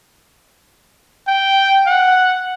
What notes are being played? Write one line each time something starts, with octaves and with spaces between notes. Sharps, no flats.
G5
F#5